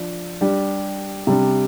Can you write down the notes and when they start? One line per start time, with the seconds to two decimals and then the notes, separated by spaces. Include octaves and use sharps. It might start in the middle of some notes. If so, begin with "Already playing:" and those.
Already playing: F3 D4
0.41 G3 D4 G4
1.27 C3 G3 D4